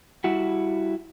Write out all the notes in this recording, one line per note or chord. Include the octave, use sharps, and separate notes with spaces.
G3 E4 F#4